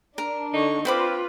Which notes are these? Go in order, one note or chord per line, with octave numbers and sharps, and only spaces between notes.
D4 A#4
D3 D#4 C#6
C4 F4 B4 C5 B5 D6